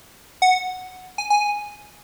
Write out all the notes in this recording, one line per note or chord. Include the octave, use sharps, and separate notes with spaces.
F#5
G#5
G#5